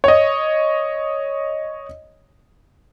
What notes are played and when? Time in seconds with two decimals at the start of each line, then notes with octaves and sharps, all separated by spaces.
0.04 C#5 D#5